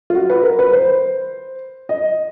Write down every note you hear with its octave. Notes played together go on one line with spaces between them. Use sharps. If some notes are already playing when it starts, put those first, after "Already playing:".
F4
F#4
B4
A#4
B4
C5
D#5